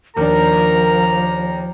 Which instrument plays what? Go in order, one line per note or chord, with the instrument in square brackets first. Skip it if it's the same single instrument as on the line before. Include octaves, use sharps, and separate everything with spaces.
[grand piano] D#2 D4 [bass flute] F3 [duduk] A#4 [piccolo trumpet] A#5